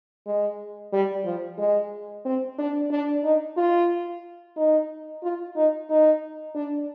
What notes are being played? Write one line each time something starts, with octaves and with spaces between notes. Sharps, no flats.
G#3
G3
F3
G#3
C4
D4
D4
D#4
F4
D#4
F4
D#4
D#4
D4